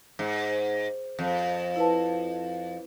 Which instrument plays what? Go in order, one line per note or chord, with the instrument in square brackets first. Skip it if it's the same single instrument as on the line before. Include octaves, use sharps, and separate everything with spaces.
[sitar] G#2
F2
[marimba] E4 B4 A5